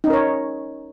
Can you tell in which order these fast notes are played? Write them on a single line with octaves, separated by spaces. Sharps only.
D#4 C#4 A#4 C#5